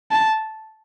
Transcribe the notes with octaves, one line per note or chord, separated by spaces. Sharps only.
A5